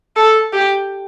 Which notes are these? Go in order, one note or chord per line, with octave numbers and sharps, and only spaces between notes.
A4
G4